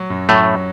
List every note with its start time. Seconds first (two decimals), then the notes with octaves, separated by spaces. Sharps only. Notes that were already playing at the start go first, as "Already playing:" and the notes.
Already playing: F#3
0.10 F#2
0.29 A2 F#3 A3